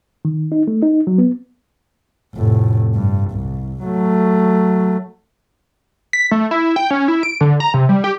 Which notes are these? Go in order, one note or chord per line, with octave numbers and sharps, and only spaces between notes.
D#3
D#4
A3
D#4
F#3
B3
F1 A2
G2
C2
F#3 A3
B6
A3
E4
G5
C#4
E4
D7
D3
A#5
C3
G3
G4